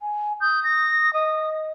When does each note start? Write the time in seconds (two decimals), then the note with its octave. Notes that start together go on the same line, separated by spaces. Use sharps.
0.01 G#5
0.41 D#6 G6
0.64 A#6
1.13 D#5 D#6